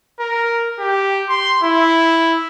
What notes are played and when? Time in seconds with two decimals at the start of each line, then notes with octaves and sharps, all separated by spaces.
0.20 A#4
0.80 G4
1.29 C6
1.64 E4